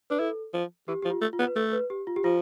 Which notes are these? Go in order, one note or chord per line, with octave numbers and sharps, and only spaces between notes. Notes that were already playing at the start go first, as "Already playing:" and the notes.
D4 B4
E4 A4
F3
E3 G4
F3 G4
F4
A3
F4
B3
B4
A3 A4
B4
G4
F4
G4
F3 F4